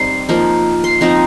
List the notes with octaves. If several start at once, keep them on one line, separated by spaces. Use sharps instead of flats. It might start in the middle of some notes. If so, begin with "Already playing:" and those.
Already playing: G3 C4 D#4 C6
F3 A#3 D#4
C6
F3 C4 D#4 A#5